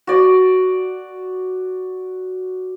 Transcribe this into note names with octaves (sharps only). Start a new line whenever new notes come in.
F#4 D5